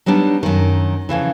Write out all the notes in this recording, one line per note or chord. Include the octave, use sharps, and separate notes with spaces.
F#3 G3 B3 D4 D#4
F#2 D#3
F2 A2 C#3 E3